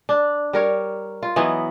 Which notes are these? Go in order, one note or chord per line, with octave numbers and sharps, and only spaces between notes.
D4
G3 A#4 C#5
F4
E3 F#3 B3 D#5